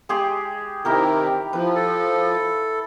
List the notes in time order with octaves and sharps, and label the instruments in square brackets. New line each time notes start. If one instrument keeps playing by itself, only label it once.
[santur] G#3 G4 G#4
[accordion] C3 D#3 [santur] E4 G4 A#4
[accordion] F3 [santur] E4 B4
[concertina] A4